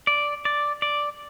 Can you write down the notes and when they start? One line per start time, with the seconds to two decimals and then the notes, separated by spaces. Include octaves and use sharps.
0.07 D5
0.45 D5
0.82 D5